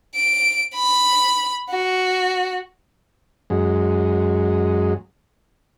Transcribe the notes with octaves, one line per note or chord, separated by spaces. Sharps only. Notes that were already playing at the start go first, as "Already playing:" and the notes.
D7
B5
F#4
F#2 G#3